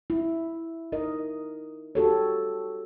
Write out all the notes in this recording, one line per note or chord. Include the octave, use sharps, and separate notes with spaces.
E4
D#4 A#4 D#5
F#4 G4 A4 C#5